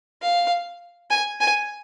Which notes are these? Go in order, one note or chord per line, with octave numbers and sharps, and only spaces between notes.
F5
G#5
G#5